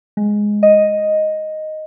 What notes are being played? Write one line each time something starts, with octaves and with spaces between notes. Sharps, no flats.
G#3
D#5